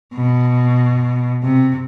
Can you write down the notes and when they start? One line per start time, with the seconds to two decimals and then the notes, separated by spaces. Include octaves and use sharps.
0.15 B2
1.43 C3